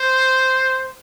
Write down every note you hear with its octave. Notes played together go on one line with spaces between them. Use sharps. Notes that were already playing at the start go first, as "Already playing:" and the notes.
Already playing: C5